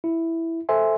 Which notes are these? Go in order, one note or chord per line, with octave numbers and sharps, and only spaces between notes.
E4
A4 C5 E5 G#5 C6